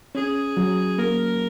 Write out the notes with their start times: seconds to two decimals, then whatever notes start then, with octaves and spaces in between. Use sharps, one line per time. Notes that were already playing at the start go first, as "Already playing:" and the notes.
0.15 C#4 G#4
0.57 F#3
0.99 A#3 A#4